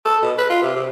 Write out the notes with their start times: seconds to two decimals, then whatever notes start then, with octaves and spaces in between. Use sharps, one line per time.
0.05 A4
0.22 B2
0.38 B4
0.50 F4
0.62 C3
0.76 C3